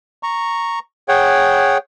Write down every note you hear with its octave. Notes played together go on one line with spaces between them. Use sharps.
A#5 C#6
G#4 C#5 F#5 G5